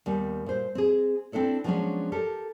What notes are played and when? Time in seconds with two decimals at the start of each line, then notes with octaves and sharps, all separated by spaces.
0.06 D#2 G3 B3
0.46 A#2 C5
0.75 C4 G#4
1.32 C4 D4 E4 A4 D5
1.64 F3 F#3 G#3 B3 C#4 D4
2.12 G4 A4 A#4